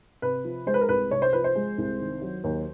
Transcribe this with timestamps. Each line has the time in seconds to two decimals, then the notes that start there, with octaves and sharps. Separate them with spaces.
0.22 C3 B4
0.45 F3
0.66 G#3 C5
0.74 B4
0.81 A#4
0.89 C2 B4
1.11 C3 C#5
1.22 C5
1.33 F3 B4
1.44 C5
1.55 G#3
1.78 C2
2.00 D#3
2.22 F#3
2.44 D#2